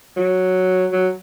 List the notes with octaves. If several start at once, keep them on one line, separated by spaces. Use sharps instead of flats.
F#3
F#3